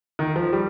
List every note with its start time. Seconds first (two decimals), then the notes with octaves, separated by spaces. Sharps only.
0.19 D#3
0.36 F3
0.53 G3